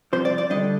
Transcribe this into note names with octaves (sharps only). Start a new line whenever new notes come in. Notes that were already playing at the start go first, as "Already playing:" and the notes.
C2 C3 F3 C5
D5
D5
D2 D3 G3 D4 D#5